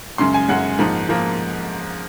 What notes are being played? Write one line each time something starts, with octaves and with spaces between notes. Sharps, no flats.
F#2 C#3 G#3 C6
G#5
F#2 C#3 G#3 F#5
G#2 F3 A#3
F3 A#3